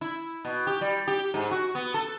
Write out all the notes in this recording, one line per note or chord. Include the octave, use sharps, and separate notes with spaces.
E4
B2
G4
G3
G4
G#2
F#4
B3
A4